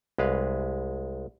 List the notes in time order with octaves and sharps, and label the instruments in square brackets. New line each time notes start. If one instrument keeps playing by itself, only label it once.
[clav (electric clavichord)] C2 G#3 B4 F5